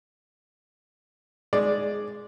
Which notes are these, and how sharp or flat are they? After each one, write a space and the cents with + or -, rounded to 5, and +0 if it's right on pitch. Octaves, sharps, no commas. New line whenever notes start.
G#3 +0 D5 +0